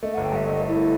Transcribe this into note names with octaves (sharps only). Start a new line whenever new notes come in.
A3 D#5
F#5
G1
G5
G2 E5
A3 D#5
A3
E4
A3